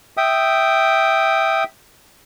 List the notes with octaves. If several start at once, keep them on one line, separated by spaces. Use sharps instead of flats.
E5 G5 D#6